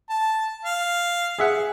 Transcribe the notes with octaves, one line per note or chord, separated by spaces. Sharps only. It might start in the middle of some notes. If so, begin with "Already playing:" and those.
A5
F5
G#4 E5 F#5